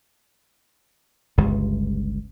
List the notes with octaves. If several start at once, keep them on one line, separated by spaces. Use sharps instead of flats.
G1 C#2 G2